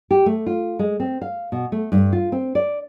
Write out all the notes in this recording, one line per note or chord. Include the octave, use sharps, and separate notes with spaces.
G4
A3
F4
G#3
C4
F5
B2
A3
G2
F4
C4
D5